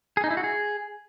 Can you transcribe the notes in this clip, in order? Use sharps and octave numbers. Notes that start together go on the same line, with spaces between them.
G#4
D#4
E4
F#4
G#4